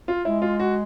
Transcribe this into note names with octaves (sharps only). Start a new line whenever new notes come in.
F4
G#3 E4
F4
F#4